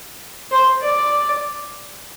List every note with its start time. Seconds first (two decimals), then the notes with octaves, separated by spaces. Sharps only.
0.51 C5
0.83 D5